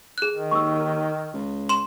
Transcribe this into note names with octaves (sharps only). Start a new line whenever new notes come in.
G#4 F#6
D#3
D#2 C#6 E6
C#2
C6 E7